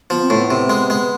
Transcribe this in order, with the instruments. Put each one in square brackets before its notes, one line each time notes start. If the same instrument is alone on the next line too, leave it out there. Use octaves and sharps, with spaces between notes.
[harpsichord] F3 [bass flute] B3
[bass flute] C4
[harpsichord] A2 [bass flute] B3
[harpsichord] C3
G#3
G#3